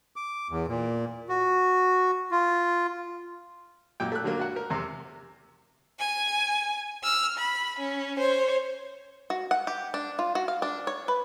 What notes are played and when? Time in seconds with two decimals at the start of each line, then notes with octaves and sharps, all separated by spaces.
0.16 D6
0.50 E2
0.68 A#2
1.29 F#4
2.31 F4
4.00 F#2 A#2 G5
4.12 A3 F#6
4.24 D3 F#3 A#3
4.39 F#4 F#5
4.56 A#4
4.70 E2 C3
5.99 G#5
7.03 E6 F6
7.38 B5
7.79 C#4
8.19 C5 C#5
9.30 F#4
9.51 F#5
9.67 G4
9.94 D4
10.19 F4
10.35 F#4
10.48 F5
10.62 D4
10.87 C#5
11.08 B4